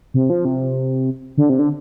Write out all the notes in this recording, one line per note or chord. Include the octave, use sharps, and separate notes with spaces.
C3
F3
C3
D3
C3
D3